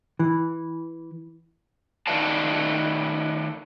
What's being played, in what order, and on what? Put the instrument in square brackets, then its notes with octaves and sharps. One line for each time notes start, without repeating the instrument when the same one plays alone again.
[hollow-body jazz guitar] E3
[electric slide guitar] D#3 A3 B4 D5 F5 A5